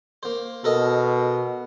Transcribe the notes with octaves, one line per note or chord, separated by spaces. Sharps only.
A#3 C5
B2 A4 A#4 D#5